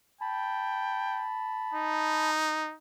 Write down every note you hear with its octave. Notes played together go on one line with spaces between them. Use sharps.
G5 A5 B5
D#4